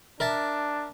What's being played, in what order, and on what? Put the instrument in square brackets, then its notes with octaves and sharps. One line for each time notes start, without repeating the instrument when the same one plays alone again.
[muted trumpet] D4 [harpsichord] A#4 E5 A5